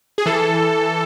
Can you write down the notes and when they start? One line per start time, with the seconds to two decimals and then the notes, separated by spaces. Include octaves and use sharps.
0.18 G#4
0.26 E3 A4
0.40 E3